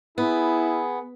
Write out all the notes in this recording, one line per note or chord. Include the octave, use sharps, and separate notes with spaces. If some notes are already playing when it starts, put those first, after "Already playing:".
B3 E4 G#4